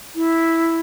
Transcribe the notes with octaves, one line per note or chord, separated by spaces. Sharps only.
E4